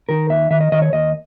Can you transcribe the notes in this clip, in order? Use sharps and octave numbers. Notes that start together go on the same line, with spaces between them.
D#3 A#4
D#2 E5
D#3 E5
D#5
D#3 D#5
C#5
D#2 D#5